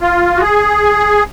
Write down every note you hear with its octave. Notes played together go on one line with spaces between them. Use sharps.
F4
F#4
G#4